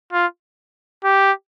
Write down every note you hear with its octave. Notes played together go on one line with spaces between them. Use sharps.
F4
G4